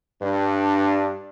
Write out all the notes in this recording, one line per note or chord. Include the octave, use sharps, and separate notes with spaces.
G2 D4